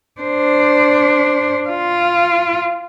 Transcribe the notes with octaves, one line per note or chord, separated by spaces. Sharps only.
D4 C5
F4